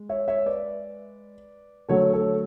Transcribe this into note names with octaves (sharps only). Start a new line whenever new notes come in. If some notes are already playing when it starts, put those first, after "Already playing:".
Already playing: G#3
C#5 E5
C#5 E5
B4 D5
D3 F#3 A3 A4 C#5
A4 C#5